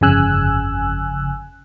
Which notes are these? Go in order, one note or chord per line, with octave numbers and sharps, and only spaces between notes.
G1 F2 C#3 G#5 E6 F#6